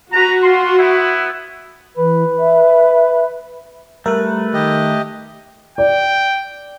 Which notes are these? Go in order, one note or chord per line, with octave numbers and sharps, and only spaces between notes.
F#4 B4 A#5
F4 C6
B3 E4
E3 B4
E5
G3 A3 A#4 B4
D#3 G4 D#5
D5 G5